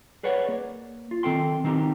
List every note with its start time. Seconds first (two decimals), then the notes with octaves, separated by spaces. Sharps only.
0.23 G#4 B4 C#5 D5 F#5
0.48 A#3
1.11 F4
1.23 D#3 C4 A4 G5 C6
1.64 D#3 C4 D#4 G4